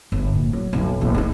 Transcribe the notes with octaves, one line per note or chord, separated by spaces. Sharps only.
G1
A#2
F#3
B1 F#2
A#1 E3
G#3 D#4